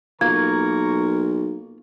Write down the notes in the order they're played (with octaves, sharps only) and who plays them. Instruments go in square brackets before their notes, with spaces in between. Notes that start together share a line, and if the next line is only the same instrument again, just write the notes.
[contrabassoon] B1 [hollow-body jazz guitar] A#3 F4 [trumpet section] A#4 C#6 [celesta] G#6